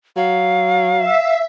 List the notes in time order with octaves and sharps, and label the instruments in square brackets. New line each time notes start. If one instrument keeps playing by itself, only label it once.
[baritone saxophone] F#3 [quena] F5
[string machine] E5